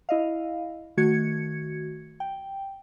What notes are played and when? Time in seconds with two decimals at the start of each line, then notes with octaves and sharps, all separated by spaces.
0.09 E4 D#5 F5
0.97 D#3 A3 F#4 G#6 C#7
2.20 G5